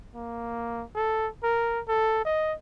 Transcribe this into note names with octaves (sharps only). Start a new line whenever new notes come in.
A#3
A4
A#4
A4
D#5